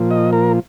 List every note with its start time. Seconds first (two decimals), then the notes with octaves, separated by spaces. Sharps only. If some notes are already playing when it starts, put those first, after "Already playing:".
Already playing: A#2 F3
0.11 D#5
0.33 A#4